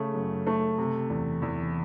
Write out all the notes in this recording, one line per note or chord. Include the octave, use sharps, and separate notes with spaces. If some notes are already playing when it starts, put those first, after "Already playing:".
Already playing: C#3 A3
F#2
A3
C3
E2
E2